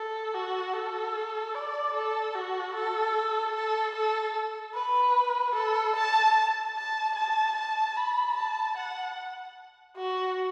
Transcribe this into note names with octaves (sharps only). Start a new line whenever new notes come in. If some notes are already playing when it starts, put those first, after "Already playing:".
Already playing: A4
F#4
A4
D5
A4
F#4
A4
A4
A4
B4
A4
A5
A5
A5
A5
B5
A5
F#5
F#4